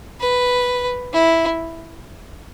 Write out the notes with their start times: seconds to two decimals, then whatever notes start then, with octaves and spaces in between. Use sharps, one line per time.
0.20 B4
1.14 E4